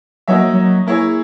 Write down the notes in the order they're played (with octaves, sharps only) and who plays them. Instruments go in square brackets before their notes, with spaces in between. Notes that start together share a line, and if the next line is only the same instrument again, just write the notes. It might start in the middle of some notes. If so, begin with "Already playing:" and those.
[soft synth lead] F#3 [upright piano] A#3 D#4 F#4 C#5 E5
[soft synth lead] F#3
[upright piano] A#3 E4 G#4 C#5